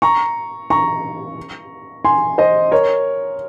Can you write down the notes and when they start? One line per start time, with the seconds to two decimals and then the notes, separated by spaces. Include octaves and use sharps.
0.02 A#5 C#6
0.70 A#5 C#6
2.05 G#5 C6
2.38 C5 D#5
2.71 A#4 C#5